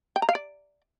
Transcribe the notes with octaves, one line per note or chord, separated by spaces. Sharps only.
G5
A#5
F5
D5